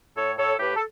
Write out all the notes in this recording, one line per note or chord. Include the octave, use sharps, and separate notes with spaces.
A2 A4 C#5
A2 A4 C#5
A2 G4 B4
A4